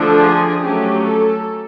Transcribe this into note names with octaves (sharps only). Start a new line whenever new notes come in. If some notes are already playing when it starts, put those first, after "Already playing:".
Already playing: D3 F3 A3 D4 A4
G#4
F#3 A3 C#4 G4
A4